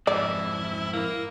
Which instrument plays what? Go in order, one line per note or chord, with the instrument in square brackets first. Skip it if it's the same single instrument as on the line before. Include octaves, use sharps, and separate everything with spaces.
[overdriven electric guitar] F2 G#2 [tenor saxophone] E4 [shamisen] D5
[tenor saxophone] A#3 [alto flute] E4